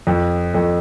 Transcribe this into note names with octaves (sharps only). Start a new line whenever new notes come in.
F2
F2